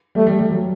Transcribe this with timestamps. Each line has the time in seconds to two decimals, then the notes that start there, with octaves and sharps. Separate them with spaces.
0.15 G3 A3
0.27 G3
0.39 G3
0.50 F#3